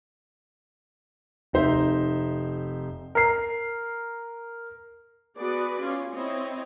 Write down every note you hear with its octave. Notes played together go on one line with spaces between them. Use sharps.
F1 D#4 C5 E5
A#4 C7
B3 F#4 G#4 B4 D5
C#4 F4
C4 E4 C#5 D#5